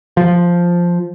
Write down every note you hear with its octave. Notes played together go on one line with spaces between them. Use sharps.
F3